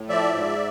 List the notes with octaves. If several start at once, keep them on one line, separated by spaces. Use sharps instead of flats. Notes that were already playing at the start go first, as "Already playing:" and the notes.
Already playing: A2
F3 D5 E5
G#2